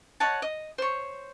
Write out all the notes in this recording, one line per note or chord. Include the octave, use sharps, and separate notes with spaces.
C#5 D#5 F#5 A5
D#5
C5 C#5